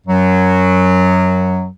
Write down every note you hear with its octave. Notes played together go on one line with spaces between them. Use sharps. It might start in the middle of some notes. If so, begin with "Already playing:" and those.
F#2 F#3